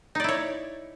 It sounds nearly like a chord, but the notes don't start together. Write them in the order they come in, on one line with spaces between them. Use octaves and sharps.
D#4 D5 E4 C#5